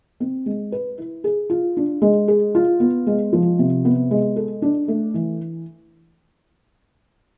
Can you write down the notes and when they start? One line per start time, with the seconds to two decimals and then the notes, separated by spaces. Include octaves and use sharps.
0.20 C4
0.46 G#3
0.72 B4
0.98 E4
1.24 G#4
1.50 F4
1.77 D4
2.02 G#3
2.28 G#4
2.55 F4
2.80 B3
3.07 G#3
3.33 F3
3.59 C3
3.85 B3
4.11 G#3
4.36 A4
4.62 D4
4.88 A3
5.14 E3